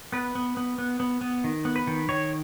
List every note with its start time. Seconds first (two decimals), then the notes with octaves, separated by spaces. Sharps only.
0.12 B3 B4
0.35 B3
0.57 B3
0.78 B3
1.00 B3
1.21 B3
1.44 D#3
1.65 B3
1.76 B4
1.87 D#3
2.09 D#3 C#5